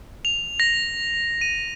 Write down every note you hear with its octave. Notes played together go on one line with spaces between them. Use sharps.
F7
A#6
D#7